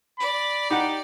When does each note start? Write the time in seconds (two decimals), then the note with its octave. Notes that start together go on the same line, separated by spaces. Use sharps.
0.20 D5 B5
0.71 D#4 G4 F#5